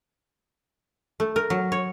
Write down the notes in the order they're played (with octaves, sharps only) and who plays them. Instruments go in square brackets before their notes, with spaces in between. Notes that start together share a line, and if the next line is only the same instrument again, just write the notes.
[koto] A3
A#4
F#3
C#5